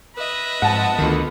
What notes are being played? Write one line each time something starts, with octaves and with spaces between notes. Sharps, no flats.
B4 D#5 E5
G#2 F3 C4 F#5 A5
D2 D#3 B3 F4 A4